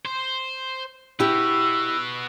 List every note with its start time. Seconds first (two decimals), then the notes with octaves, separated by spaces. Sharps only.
0.05 C5
1.20 E4 F#4 G4 B4 E6